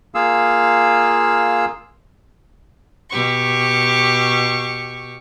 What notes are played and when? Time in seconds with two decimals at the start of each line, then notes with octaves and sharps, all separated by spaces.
0.15 A#3 F4 G#4 F5 E6
3.09 B2 G4 C#6